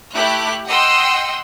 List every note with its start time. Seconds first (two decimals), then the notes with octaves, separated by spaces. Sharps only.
0.14 A3 E4 G4 F#6
0.69 D#5 F#5 G5 C6 E6